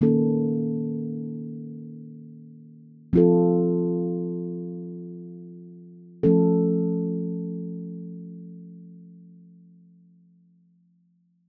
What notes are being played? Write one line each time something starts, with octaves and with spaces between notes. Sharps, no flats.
D#3 A#3 C#4 A4
F3 C4 F4 A4
F3 A3 C#4 A4